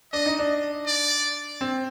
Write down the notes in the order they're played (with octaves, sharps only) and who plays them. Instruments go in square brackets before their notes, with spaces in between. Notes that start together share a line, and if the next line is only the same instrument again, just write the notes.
[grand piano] D4 [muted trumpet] D#5
[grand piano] D#4
D4
[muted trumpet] D5
[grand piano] C4